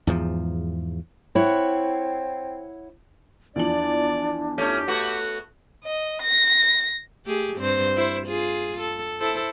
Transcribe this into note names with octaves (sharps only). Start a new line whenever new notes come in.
E2 G#2 F3
C4 E4 C#5 F#5
E2 F3 D4 D5 F#7
A3 C#4 G4
A3 B3 F#4
D#5
A#6
A3 G4 G#4
G2 C4 C5
E4 C5
F4 G#4
A4
E4 A4 C5